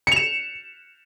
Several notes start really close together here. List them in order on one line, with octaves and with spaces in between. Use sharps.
C#7 F7 E7